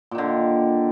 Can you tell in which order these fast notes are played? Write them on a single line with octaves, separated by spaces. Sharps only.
A#2 D#3 D3